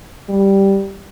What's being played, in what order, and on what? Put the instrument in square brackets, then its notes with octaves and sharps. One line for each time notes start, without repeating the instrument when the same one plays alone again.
[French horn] G3